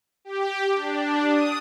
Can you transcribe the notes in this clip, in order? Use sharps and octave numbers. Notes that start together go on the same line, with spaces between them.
G4
D4
D#6